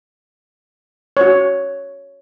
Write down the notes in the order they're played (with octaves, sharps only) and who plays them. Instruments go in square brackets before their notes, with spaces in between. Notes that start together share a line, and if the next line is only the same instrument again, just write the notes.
[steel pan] F#4 C#5